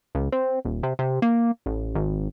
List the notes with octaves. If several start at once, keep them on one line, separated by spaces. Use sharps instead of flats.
C#2
C4
D#1
C3
C3
A#3
A1
G#1